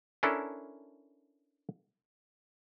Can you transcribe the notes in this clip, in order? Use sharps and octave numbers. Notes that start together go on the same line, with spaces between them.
C#4 D4 E4 A4 A#4